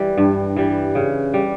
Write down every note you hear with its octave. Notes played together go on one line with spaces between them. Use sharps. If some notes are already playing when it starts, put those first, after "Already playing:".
Already playing: E3 G3 E4
G2
E3 G3
C#3
G3